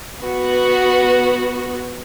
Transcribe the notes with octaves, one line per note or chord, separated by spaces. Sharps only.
B3 F#4